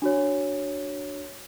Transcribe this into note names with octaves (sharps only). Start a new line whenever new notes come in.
D4 F#4 C#5